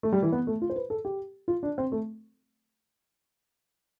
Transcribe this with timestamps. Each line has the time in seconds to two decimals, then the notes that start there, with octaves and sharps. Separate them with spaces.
0.03 A3
0.13 G3
0.22 E3
0.32 B3
0.47 A3
0.62 F4
0.70 C5
0.76 B4
0.90 A4
1.05 G4
1.48 F4
1.63 D4
1.78 C4
1.92 A3